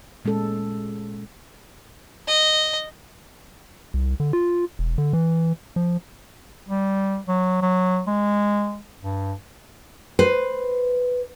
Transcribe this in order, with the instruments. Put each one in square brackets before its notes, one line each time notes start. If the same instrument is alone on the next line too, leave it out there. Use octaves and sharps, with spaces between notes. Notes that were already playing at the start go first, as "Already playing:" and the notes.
[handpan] A#2 G#3 C#4 A4
[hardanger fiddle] D#5
[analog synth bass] C2
D3
F4
E1
D3
E3
F3
[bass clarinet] G3
F#3
F#3
G#3
G2
[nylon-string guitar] B4 C5